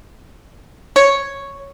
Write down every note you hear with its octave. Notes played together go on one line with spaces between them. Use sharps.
C#5